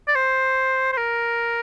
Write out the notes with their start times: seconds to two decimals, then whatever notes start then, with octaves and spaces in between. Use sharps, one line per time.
0.08 D5
0.15 C5
0.92 C5
0.97 A#4